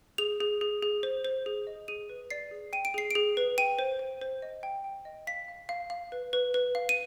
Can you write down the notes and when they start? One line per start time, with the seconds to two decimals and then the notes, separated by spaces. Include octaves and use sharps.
0.18 G#4 F7
0.40 G#4
0.61 G#4
0.83 G#4
1.03 C5
1.25 C5
1.46 G#4
1.67 D#5
1.88 G#4 D#7
2.10 B4
2.30 D5 C7
2.51 G#4
2.73 G5 D#7
2.85 D7
2.94 G#4 C7
3.11 G#4 D7
3.37 B4
3.58 G5 D#7
3.79 C5
3.99 C5
4.21 C5
4.42 D#5
4.63 G5
4.84 G5
5.05 D#5
5.27 F5 B6
5.48 F5
5.69 F5
5.90 F5
6.12 B4
6.33 B4
6.54 B4
6.75 F5
6.89 D#7